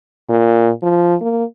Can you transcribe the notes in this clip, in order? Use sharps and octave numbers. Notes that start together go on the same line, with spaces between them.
A#2
F3
A#3